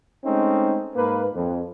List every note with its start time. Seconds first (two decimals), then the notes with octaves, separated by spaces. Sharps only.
0.25 G#3 A3 C4 C#4 D#4
0.96 G#2 A#3 B4
1.35 F2